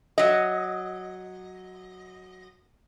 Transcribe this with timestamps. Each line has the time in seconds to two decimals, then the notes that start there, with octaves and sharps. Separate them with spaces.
0.18 F#3 D#5